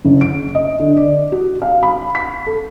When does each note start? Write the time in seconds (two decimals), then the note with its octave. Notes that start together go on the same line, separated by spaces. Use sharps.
0.05 F#1
0.21 D7
0.55 D#5
0.80 D3
0.97 D5
1.32 F#4
1.62 F5
1.83 B5
2.15 B6
2.46 A4